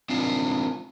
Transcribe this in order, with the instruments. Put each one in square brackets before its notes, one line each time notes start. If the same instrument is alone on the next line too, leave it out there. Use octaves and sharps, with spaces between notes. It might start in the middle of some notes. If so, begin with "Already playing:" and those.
[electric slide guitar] C4 D4 F4